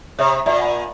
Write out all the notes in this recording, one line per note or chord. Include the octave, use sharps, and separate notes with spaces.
C3 C#5 E5
A#2 D5 E5 A#5
F#5 B5